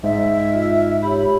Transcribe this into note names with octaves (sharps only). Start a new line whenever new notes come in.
G#2 D#5 E5
F4
G4 C#5 B5